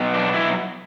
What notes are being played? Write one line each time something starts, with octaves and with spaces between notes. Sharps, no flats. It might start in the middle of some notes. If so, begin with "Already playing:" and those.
Already playing: B2 F#3
D4
E4